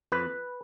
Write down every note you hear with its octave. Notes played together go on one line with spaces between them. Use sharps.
F2 B4